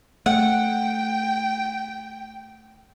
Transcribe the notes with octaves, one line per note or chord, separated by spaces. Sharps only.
A3 F#5 G5